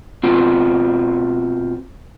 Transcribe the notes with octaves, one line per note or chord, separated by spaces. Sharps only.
B2 C4 F4 F#4